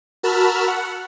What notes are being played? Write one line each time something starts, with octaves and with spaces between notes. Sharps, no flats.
F#4 A#4 A5 B5 E6 F6
F#5